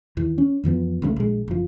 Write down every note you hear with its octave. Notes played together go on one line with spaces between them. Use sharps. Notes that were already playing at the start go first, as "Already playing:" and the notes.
D#2 E3
C#4
F2 E3 F3 B3
C#2 C#3 F3 A3
A#1 G#3
F#1 F3